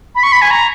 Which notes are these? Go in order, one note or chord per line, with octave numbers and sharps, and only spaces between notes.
B5
C#6
B5
G#5
A#5